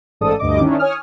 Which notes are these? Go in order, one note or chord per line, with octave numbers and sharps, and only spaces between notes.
A1 G#2 A4 D5 D#6
D2 G2 D#5 D6
D#3 C#4 D4 E4
C#5 G#5 D#6 F6